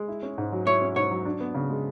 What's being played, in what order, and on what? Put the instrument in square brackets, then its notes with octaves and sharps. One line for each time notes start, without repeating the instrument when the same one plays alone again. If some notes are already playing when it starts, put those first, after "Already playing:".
Already playing: [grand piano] G#3
E4
C#4
G#2
F#3
[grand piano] E4 [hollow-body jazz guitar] C#5
[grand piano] C#4
[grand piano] G#2 [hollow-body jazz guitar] C#5
[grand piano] F#3
D4
B3
C#3
G#3